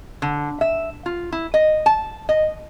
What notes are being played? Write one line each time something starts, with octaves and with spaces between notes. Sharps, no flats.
D3
E5
F4
E4
D#5
A5
D#5